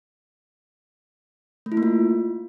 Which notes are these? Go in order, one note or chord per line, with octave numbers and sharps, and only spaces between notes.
A3
E4
A#3
F4